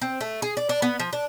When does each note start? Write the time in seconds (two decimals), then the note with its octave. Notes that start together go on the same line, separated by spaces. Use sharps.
0.01 C4
0.21 A3
0.42 G#4
0.57 D5
0.69 D4
0.82 B3
1.00 F3
1.13 D4